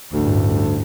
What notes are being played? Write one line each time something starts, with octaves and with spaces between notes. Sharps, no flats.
A1 D2 G2